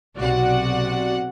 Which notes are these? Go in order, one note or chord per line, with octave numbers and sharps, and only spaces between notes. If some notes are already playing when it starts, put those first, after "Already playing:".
B1 C3 F#4 D5 F#5